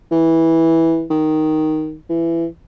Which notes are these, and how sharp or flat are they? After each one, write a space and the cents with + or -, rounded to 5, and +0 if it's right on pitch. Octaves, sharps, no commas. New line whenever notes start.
E3 -10
D#3 +0
E3 +20